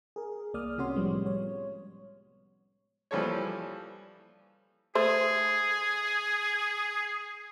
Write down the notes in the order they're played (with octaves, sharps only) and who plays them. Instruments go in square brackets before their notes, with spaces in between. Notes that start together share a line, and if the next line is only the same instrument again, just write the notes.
[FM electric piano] G#4 A#4
C2 A#3 D5 D#6 F6
C3 C#4 F#4 C#5 C6
A2 F3 G3 G#3 B3
C#5
[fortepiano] E3 F3 G3 A4 C#5
[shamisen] A3 C5 [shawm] G#4